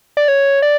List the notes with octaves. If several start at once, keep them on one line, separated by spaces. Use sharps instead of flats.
D5
C#5
D5